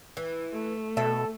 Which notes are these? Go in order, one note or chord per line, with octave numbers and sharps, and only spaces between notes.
E3
A3
B2 A4 E5